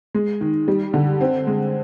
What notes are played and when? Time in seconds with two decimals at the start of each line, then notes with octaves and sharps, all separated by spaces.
0.14 G#3
0.41 D#3
0.68 G3
0.94 D3
1.21 C4
1.47 G#3